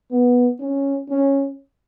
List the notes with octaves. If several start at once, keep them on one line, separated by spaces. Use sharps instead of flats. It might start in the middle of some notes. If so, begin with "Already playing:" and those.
B3
C#4
C#4